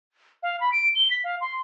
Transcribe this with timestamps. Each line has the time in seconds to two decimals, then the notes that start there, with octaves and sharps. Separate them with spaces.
0.43 F5
0.60 B5
0.72 D7
0.95 G7
1.11 B6
1.24 F5
1.41 C6